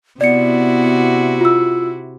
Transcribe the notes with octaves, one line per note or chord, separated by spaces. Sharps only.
C3 B3 E4 F#4 D5 C#7
F4 E6